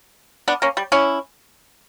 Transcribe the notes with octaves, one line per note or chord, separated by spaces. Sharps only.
B3 D4
A#3 C#4
G3
C#4 E4